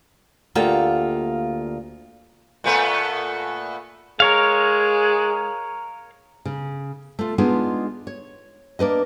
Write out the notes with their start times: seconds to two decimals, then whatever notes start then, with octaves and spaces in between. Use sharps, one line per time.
0.55 D2 A#3 F4 G4 A4 G5
2.64 A#2 A3 B3
4.20 G#3 A#4 C#5 F5
6.45 C#3
7.19 A3 F4
7.38 G#3 B3 D4 D#4 F4 G#4
8.07 C#5
8.79 A#3 D4 B4 D#5